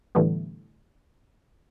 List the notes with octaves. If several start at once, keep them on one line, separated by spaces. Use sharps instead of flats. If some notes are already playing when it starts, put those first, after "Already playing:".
A2 D3 E3 G3 A3 B3